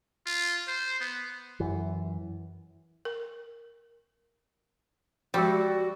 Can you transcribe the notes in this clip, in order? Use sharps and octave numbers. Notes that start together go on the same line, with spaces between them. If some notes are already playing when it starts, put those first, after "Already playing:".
F4
C5
B3
F#2 E3
A#4
F3 G3 G#3 F#4